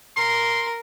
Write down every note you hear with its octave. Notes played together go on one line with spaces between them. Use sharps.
A#4 C6